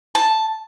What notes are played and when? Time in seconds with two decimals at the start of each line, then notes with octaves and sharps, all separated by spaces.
0.15 A5